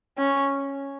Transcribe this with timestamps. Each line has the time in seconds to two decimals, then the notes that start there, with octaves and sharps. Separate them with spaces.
0.18 C#4